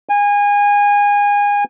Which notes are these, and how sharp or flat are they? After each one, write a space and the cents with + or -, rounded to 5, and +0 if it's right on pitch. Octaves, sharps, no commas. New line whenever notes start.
G#5 -25